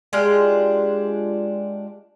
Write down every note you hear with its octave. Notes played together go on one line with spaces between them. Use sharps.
G#3 D4 F4 G4